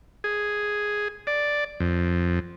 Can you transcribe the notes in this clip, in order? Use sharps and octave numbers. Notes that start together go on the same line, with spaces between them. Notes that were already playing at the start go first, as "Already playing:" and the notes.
G#4
D5
F2